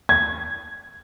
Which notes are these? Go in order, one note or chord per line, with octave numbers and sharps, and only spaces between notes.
G#6